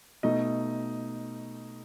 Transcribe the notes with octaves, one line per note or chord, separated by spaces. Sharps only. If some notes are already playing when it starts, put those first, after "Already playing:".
B2 A3 D#4 D#5